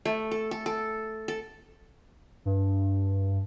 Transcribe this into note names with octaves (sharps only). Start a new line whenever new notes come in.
A3
A4
A4
A4
A4
G2